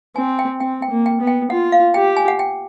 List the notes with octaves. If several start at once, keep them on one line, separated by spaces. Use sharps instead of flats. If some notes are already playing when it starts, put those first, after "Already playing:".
C4 G#5
G5
C4 G5
G5
A#3
G5
B3
G5
F4 F#5
F5
G4 G5
G#5
F#5
G5